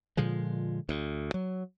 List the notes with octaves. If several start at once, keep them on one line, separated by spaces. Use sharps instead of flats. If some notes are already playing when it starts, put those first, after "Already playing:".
A#2 D3 F3 G#3
D2
F#3